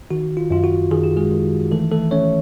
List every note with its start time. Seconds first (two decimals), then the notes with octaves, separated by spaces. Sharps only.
0.11 D#3 F#4
0.37 F4
0.51 F#2 F4
0.64 F#4
0.91 D#3 G#4
1.04 G4
1.17 G#3 G#4
1.31 D#3
1.72 E3 A3 A4
1.92 A3 A4
2.11 A3 C#4 C#5